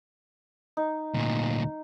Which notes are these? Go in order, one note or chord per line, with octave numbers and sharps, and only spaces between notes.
D#4
D2 A#2